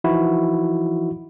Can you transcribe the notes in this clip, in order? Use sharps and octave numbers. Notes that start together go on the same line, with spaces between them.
E3 F3 D#4 E4 F#4